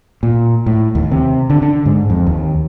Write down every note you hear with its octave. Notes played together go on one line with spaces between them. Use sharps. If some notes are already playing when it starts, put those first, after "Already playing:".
A#2
A2
D#2
C3
D3
D3
G#2
F2
D#2